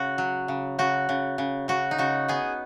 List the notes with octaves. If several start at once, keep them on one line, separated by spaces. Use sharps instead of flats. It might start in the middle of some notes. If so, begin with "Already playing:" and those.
Already playing: C#3 F#4
F#3
C#3
C#3 F#4
C#3
C#3
C#3 F#4
D#4
C#3 F#4
B3 G#4